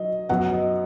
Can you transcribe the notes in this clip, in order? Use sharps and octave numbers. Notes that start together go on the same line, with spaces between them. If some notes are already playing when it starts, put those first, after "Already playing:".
Already playing: F#3 D#5
F#2 F#3 B3 F#5
D#5